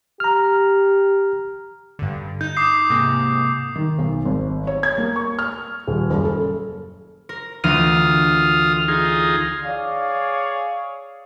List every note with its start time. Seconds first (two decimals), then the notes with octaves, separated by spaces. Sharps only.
0.20 G4 A#5 F6
1.99 G2 D3
2.41 D#4 G6
2.57 D6 D#6 C7
2.89 G#2 C3 A#3
3.76 D#3
3.98 B1
4.25 G#1
4.67 C#5
4.83 G#6
4.98 A#3
5.16 C#6
5.39 F6
5.87 D#1
6.10 F#1
6.25 A4
7.29 A#4
7.64 D2 E3 F4 D#6 F6 D#7
8.88 D#4 F4 G#4
9.63 G#4 C#5 D5 F5